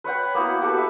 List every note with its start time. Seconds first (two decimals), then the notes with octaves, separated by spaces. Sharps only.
0.04 B4 C#5 F#5 G5
0.35 A#3 B3 E4 F#4
0.62 F#4 G4 A4 B4
0.76 B4 E5